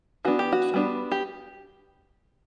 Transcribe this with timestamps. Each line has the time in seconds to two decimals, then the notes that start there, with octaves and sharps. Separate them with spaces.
0.25 E3 B3 D4 F#4
0.39 G4
0.52 F#4
0.74 G3 B3 D4
1.12 G4